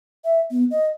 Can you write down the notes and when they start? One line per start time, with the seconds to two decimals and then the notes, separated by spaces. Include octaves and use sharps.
0.24 E5
0.51 B3
0.71 D#5